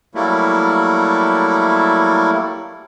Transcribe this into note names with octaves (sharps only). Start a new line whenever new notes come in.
F#3 G3 A3 A#3 E4